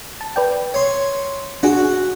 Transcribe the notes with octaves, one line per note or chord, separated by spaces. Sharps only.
A5
B4 D5 G5
C#5 C6
D4 F#4 G#4